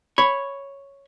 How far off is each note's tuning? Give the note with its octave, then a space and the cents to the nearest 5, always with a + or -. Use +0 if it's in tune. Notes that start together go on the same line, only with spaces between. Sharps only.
C#5 +0 B5 +0